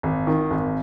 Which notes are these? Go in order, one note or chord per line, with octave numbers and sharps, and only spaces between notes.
G#1
D#3
G#1